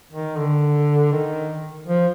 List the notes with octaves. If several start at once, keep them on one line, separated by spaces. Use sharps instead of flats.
D#3
D3
D#3
F3